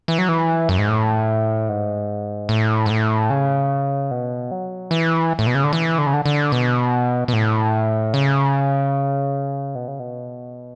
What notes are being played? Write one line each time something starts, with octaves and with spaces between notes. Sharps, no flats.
E3
F#3
E3
F#2
G#2
A2
G#2
A2
G#2
A2
C#3
B2
F#3
E3
A2
B2
C#3
D3
E3
D3
C#3
D3
D3
B2
B2
A2
C#3
B2
C#3
B2